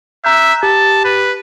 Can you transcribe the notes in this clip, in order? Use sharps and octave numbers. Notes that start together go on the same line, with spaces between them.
E5 A#5 F#6 G6
G4 A5
B4